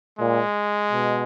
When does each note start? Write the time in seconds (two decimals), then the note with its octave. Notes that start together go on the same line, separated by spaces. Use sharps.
0.19 A#2 G#3
0.92 B2